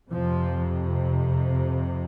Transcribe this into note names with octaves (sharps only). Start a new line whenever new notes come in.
F2 C3 F3